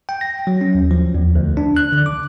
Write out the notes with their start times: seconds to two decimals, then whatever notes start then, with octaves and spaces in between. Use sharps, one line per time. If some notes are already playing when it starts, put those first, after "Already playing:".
0.09 G5
0.21 A#6
0.47 F#3
0.61 C#4
0.75 D#2
0.91 F3
1.15 E2
1.36 D2
1.57 D4
1.77 F#6
1.92 D3
2.06 D6